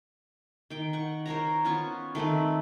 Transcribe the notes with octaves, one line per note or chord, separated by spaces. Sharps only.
D#3 G5
F#5 C#6
A#4 C5 C#5 A#5
B3 C#4 F4 C#6
D#3 A3 C4 B4